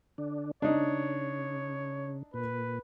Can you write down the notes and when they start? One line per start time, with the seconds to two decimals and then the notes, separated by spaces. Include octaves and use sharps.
0.18 D3 D4
0.62 C#3 D4 D#4 C#5
2.34 A#2 B4